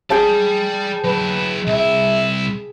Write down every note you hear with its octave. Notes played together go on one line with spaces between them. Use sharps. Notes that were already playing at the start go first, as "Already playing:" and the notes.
G#4 D5 G5 A5 B5
F#3 E4 B4
C2 E4 E5